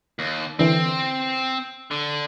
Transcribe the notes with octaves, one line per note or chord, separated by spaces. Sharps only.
D#2
D3 E3 C4
D3